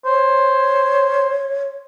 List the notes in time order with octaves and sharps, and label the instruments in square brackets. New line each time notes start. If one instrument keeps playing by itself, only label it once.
[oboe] C5 [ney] C#5